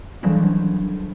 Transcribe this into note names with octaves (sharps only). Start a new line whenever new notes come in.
D#3 E3 F#3 G3 D4